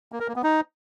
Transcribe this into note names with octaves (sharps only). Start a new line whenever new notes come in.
A#3
A#4
A#3
B3
D#4